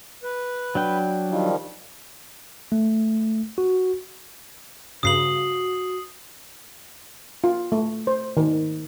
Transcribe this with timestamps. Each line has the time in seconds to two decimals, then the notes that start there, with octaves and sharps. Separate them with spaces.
0.23 B4
0.75 F#3 D4 G5
1.30 D#3 F3 G3
2.72 A3
3.58 F#4
5.03 G2 C#3 F#4 D#6 C7 F#7
7.44 F4
7.72 A3
8.07 C5
8.37 D#3